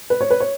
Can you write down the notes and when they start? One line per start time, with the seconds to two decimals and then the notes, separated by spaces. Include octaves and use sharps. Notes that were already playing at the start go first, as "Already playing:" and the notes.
0.10 B4
0.21 C#5
0.31 B4
0.40 C#5